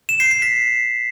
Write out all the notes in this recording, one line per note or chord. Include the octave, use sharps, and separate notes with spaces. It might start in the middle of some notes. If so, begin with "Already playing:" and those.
E7
C7
C7
B6